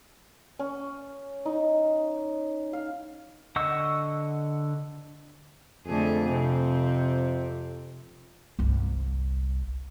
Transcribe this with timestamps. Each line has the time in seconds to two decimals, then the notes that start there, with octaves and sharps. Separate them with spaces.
0.59 C#4
1.46 D#4
2.73 F5
3.56 D3 D#5 F#5 C#6 E6
5.86 F2 D3 A3 G#4
6.30 C3 C4
8.59 G1 C2